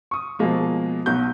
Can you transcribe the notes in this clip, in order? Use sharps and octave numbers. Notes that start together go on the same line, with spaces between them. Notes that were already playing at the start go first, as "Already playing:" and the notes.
C#6 D#6
B2 F3 G#3 A#3
B1 B2 F#4 G6